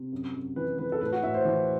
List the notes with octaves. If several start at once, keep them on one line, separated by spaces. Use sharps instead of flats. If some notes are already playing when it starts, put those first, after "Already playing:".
Already playing: C3
F#2
F#2
E3 B4
E3 B4
A4
A2 B4
F#4
A2 E5
C5
E3